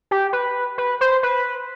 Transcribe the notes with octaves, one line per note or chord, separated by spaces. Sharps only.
G4
B4
B4
C5
B4